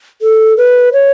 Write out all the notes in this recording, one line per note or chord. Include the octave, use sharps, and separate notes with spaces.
A4
B4
C#5